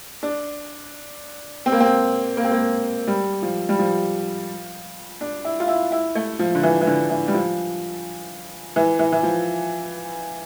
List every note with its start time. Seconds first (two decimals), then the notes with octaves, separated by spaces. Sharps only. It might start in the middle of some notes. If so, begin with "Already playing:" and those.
0.23 D4
1.66 C4
1.72 A#3
1.80 C4
2.37 A#3
2.44 C4
2.52 A#3
3.07 G3
3.42 F3
3.69 G3
3.79 F3
5.21 D4
5.45 E4
5.60 F4
5.68 E4
5.92 E4
6.15 A3
6.39 F3
6.55 D3
6.63 E3
6.81 E3
6.87 D3
7.10 E3
7.28 G3
7.34 F3
8.76 E3
8.99 E3
9.12 E3
9.23 F3